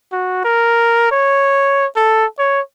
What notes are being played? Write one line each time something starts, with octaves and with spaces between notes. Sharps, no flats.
F#4
A#4
C#5
A4
C#5